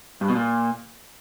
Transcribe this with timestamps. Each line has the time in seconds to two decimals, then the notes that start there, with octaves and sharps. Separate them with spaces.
0.21 G2
0.28 B2
0.35 A#2